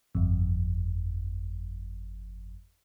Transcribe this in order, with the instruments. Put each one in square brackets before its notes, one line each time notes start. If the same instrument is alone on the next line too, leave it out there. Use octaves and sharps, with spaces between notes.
[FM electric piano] G1 F2